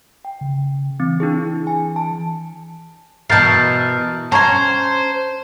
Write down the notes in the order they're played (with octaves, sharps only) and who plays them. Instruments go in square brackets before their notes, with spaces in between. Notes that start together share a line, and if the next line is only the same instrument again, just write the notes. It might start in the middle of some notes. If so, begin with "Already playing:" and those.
[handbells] G5
[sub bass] C#3
[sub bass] E3 [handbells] C4
[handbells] D4 E4 G#4
G#5
A5
[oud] B2 E3 [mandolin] A#4 A5 [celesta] G6 A6 C7
[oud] C#4 [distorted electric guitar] C5 [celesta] A5 G#6 [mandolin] A#5 C6